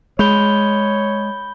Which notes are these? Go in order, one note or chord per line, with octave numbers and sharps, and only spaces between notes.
G#3 C#5 B5 G6 G7